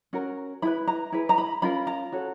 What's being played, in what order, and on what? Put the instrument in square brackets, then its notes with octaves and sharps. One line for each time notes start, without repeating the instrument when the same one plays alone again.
[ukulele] C#4 F#4 A#4
E4 G#4 B4 B5
A#5
E4 G#4 B4
A#5
B5
C#4 F4 A#4 B5
A#5
C#4 F#4 A4